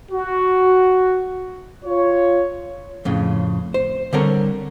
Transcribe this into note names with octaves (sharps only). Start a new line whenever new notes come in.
F#4
F4 C#5
F2 A2 C#3
C5
D3 G3 C4 A4 A#4 C#5